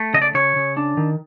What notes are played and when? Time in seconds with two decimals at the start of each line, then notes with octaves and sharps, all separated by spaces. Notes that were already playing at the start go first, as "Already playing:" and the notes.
Already playing: A3
0.14 C#3 D#5
0.22 D5
0.34 C#3 C#5
0.56 C#3
0.77 D4
0.97 D#3